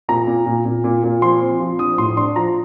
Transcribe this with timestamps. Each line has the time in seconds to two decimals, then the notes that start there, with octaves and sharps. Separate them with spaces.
0.09 A#2 A#5
0.27 A#2
0.46 A#2
0.65 A#2
0.84 A#2
1.04 A#2
1.22 F3 C6
1.42 C4
1.60 F3
1.79 D4 D#6
1.98 A2 C6
2.17 D4 C6
2.36 F3 A#5